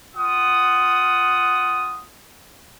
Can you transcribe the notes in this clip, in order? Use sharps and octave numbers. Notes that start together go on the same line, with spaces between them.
F4 F#5 D#6